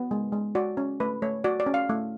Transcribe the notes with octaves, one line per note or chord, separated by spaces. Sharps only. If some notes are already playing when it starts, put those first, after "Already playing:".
Already playing: B3
G#3
G#3
F#4 D5
C#4
A3 B4
A3 C#5
F#4 D5
D5
C#4
F5
A3